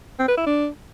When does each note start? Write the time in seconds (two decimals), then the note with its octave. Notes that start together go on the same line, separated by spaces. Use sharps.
0.19 C4
0.28 B4
0.37 E4
0.47 D4